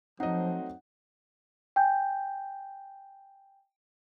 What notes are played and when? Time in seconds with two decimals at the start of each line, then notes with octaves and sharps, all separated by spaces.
0.20 F3 F#3 A3 C4 D#4 D#5 F#5
1.76 G5 G#5 G6